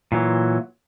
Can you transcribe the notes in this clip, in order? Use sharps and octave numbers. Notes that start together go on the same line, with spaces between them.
A#2 E3 F#3